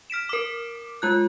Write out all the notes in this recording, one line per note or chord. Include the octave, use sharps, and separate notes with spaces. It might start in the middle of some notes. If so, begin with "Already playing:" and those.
F6 B6 D7 E7
A#4 D6
G#3 F4 F#6